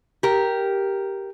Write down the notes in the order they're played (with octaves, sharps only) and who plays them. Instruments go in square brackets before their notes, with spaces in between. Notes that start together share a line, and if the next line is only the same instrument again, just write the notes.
[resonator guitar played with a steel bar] G4 A#4